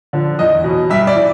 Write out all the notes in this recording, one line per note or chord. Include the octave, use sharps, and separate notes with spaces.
D3 F3
E2 D#5
B2 F#3
G2 E5
D5
E3